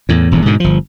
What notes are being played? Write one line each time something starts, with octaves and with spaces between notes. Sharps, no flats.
E2 A2
D#1 E2 G2
G#2 B2 D3
G1 F3